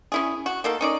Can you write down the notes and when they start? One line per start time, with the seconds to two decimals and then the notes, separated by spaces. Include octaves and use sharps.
0.12 C#4 E4 G#4
0.46 F#4
0.64 D#3 A#3 A4
0.81 C#4 D#4 D5